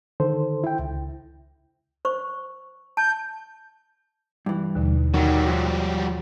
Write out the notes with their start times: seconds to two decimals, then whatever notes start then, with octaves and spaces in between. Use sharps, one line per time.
0.20 D3 D#3 A4 C5
0.64 E4 G5
0.79 C#2
2.05 C5 C#6
2.97 A5 G6
4.46 G2 E3
4.75 D#2 B2 D3
5.14 D#3 F#3 G3
5.47 F3